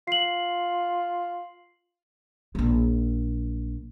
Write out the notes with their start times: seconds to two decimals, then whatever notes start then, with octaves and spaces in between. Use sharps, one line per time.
0.08 F4 C7 F#7
2.55 A#1 F#3